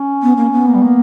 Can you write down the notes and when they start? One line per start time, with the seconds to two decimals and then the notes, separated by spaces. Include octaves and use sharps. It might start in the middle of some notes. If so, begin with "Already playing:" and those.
Already playing: C#4
0.22 B3
0.37 A#3
0.52 B3
0.67 A#3
0.75 G3
0.83 A#3